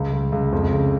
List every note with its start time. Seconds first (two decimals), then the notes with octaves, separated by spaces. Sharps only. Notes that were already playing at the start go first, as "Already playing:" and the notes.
Already playing: C#2
0.13 C#2
0.32 C#2
0.52 F2
0.72 C#3